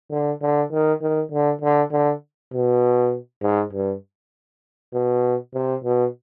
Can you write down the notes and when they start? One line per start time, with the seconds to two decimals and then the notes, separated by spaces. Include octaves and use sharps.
0.11 D3
0.42 D3
0.72 D#3
1.01 D#3
1.32 D3
1.61 D3
1.91 D3
2.53 B2
3.42 G#2
3.73 G2
4.93 B2
5.54 C3
5.84 B2